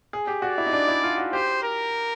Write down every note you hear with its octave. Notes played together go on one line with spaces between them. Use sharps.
G#4
G4
F#4 D5
E4
D#4
D4
E4
F4
F#4
G4 C5
A#4